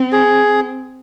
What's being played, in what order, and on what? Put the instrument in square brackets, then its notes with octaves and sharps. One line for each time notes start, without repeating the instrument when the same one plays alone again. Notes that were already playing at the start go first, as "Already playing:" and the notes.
Already playing: [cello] C4
[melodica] G#4